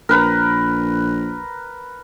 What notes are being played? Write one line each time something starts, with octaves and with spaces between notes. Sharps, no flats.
A#1 A#4 B4 A#5